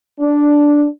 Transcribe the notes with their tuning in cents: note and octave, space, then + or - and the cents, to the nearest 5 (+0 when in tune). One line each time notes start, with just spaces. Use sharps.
D4 -5